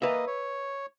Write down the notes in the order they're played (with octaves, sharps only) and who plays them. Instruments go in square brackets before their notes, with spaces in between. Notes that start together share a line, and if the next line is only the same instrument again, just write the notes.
[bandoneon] A#3 D#5 [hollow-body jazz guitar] B4 E5
[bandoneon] C#5